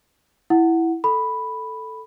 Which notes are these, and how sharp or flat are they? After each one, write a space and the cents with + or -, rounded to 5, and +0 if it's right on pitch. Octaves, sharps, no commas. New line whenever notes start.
E4 +0 F#5 +0
A4 +0 B5 +0